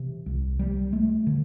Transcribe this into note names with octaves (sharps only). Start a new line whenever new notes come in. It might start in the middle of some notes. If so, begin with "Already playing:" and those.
Already playing: C3 E3
C2
G3
A3
D3